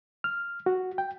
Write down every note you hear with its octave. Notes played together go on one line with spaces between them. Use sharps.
F6
F#4
G5